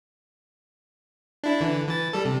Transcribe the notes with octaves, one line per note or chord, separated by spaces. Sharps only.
D4 E4
D3 E3
E3 A6
G3 A4
C3